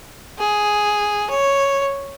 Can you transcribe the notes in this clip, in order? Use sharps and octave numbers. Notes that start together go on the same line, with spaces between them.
G#4
C#5